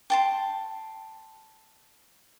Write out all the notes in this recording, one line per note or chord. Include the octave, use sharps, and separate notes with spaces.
G5 A5 C6